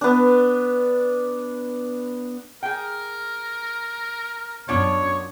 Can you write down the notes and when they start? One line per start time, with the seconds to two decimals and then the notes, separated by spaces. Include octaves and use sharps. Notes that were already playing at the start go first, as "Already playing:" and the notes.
0.01 B3 D4
2.63 G#4 A#4 G5
4.68 F#2 F#3 B3 D4 F4 C#5